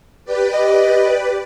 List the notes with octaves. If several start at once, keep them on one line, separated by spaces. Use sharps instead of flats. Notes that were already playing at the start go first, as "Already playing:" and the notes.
G4 B4 D5
D#5